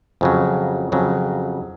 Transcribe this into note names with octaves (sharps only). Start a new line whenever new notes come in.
F2 C#3 F#3
F2 C#3 F#3